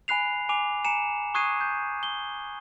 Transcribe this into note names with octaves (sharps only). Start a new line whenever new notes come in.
G#5 B5 F#6 C7 F7
G#5 D6 F7
G#5 A#5 C#7 E7
C#6 D#6 F#6 G#6 C7 D#7
G6
G7